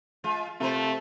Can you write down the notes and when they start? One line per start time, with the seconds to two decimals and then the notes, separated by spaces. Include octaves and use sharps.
0.24 G#3 F4
0.60 C3 A3 F4 A#4 C5